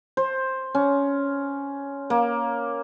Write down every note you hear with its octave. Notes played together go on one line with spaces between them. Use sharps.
C5
C#4
A#3